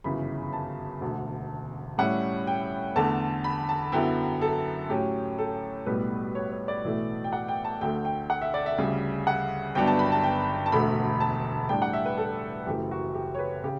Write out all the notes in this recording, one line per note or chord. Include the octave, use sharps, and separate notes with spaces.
G1 F#2 C#3 E3 B5
A5
E1 D2 D3
A2 G3 C#4 E4 F#5
G5
E2 D3 A3 A5
B5
A5
F#2 D3 F#3 B3 E4 G5
A4
A2 F#3 C#4 G4
A4
B1 A2 G3 B3 B4
C#5
C#5
D5
B1 A2 E3 A3 E4
G5
F#5
G5
A5
D2 D3 A3 G5
G5
F#5
E5
D5
E5
D2 C#3 G3
F#5
G1 G2 F#3 B3 D4 G5
A5
B5
A5
G5
A5
E1 D2 D3 A3 B5
A5
A2 G3 D4 G5
F#5
E5
B4
A4
F#1 F#2 E3 A3 G4
F#4
G4
C#5
B4
C#3 G4